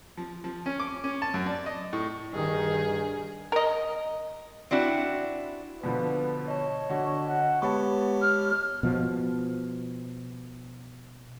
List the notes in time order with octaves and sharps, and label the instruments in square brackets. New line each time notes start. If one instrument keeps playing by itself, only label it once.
[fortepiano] F3
F3
C#4
D6
C#4
A5
F#2
D5
D#5
A2
[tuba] G2 [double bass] D#3 [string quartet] G#4
[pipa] A#4 D#5
[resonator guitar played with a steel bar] C4 D4 E4 F#4
[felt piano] B2 D3 F3 [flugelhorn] B4
[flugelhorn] C#5 [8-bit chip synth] D#5 A5
[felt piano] D3 F#4
[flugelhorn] F#5
[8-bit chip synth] G#3 G4 C#5 [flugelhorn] B3 [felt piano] A5 B5 C#6
[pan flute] F6
[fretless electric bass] B2 F3